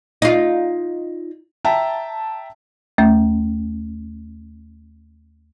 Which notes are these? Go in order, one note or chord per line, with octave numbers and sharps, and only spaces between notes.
D#4 F4
E5 G5 A5 A#5
D#2 A3 C#4 G6